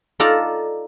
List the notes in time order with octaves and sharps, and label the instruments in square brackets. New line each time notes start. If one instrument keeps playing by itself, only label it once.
[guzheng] D#4 F4 A4 D5 A#5